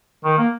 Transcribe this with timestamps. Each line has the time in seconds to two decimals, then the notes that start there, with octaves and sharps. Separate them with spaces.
0.25 D#3
0.38 A#3